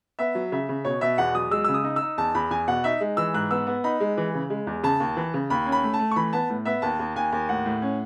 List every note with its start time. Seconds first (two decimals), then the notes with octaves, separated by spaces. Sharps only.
0.19 B3 E5
0.35 F#3
0.52 C#3 E5
0.69 C#3
0.85 B2 C#5
1.01 B2 E5
1.18 E2 F#5
1.35 F#3 D#6
1.51 G#3 E6
1.64 C#3 E6
1.74 D#6
1.84 D#4
1.96 E6
2.02 D#4
2.18 E2 A5
2.35 E2 B5
2.51 E2 G#5
2.68 B2 F#5
2.84 D#4 E5
3.01 G#3
3.17 E3 E6
3.34 G#2 F#6
3.51 B3 E6
3.67 B3
3.84 D#4 B5
4.00 G#3
4.17 E3
4.34 C#3
4.50 G#3
4.67 E2
4.83 C#3 A5
5.00 D#2
5.17 E3
5.34 C#3
5.50 D#2 B5
5.66 C#4
5.72 B5
5.83 A3
5.94 A5
5.99 A3
6.11 C#6
6.16 E3 B5
6.33 B3 A5
6.50 A2
6.66 B3 E5
6.82 D#2 A5
6.99 D#2
7.16 D#2 G#5
7.33 D#2
7.49 A2 F#5
7.66 A2
7.82 C#4